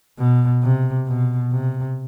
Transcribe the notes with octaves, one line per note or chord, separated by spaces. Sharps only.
B2
C3
B2
C3